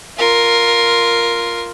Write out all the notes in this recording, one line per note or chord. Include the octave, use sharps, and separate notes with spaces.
F4 A#4